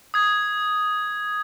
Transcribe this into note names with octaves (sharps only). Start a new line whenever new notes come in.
D#6 G#6